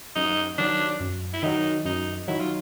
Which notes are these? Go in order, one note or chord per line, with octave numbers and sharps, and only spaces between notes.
F#2 D#4
D#3 F#3 D4
F#2
E4
D#3 F#3 D#4
F#2 D#4
D#3 F#3 E4
F4